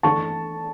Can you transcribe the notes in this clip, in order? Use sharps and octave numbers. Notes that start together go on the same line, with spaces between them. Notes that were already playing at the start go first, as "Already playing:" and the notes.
E3 A3 D4 A5 C#6